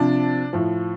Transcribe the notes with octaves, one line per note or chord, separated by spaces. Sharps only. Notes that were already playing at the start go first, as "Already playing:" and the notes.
Already playing: C3 F3 D4
A2 F3